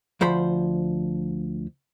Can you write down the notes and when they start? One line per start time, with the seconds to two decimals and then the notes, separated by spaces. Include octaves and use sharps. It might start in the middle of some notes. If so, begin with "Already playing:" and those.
0.21 D2 F3 C5 B5